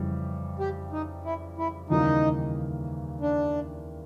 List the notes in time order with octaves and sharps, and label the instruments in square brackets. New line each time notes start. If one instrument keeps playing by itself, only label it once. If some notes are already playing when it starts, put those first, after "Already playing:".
Already playing: [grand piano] F2 C#3 E3 G3
[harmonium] G4
D#4
E4
E4
[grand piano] D#2 C#3 E3 G3 A#3 [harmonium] D#4
[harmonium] D4